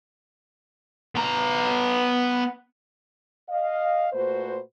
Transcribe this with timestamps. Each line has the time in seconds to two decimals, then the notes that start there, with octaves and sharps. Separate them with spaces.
1.15 B3 A#5
3.49 D#5 F5
4.13 A#2 A3 F#4 B4 C5